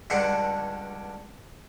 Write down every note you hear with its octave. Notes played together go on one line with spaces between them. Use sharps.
C#2 G2 D3 D4 A4 F#5